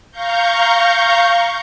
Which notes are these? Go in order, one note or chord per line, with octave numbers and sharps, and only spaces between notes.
F5 A#5 C#6 G6